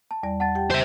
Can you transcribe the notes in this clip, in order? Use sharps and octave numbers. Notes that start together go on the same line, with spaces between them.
A5
E2 G3 D5
F#5 A5 A6
G4 G5
C5 E5